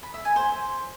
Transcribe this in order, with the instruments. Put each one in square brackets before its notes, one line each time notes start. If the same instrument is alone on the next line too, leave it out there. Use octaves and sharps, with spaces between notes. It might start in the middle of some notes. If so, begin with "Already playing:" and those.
[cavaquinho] B5
E5
G#5
C5